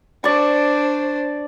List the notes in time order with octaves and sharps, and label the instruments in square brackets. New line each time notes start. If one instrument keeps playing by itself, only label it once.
[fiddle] D4 C5 [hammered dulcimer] D5 C#6